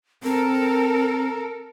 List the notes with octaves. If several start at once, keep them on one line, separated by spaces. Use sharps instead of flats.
C4 A4 A#4